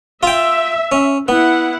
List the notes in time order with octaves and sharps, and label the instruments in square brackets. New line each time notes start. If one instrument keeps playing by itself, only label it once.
[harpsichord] F4 G5 [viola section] E5
[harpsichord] C#4
[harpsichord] B3 [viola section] E4 F#5